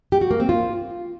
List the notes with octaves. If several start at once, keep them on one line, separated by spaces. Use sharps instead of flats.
G4
F#4
A#3
C4
F4